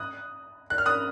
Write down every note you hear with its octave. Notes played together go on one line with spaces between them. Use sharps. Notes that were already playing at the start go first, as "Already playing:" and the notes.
Already playing: D#6 F#6
F#6
F6
D#6 F#6